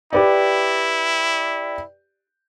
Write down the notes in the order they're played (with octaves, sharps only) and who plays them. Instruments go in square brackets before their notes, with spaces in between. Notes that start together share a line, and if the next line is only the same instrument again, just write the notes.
[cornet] E4 [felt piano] G4 B4 D5